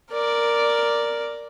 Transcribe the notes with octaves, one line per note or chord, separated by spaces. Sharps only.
A#4 D5